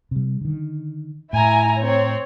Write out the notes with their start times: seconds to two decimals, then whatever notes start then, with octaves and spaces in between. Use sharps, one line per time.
0.11 C3 G3
0.41 D3 D#3
1.33 A2 E4 G#5 A#5
1.79 C4 C#5